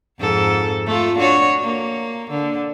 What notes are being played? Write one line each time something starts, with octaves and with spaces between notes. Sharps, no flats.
F2 G#2 A4
A3 F4
D4 F#4 C#5
A#3
D3